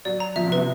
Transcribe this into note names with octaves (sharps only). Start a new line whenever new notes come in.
F#3 D5
A#5
F3 E5
C3
B4
C3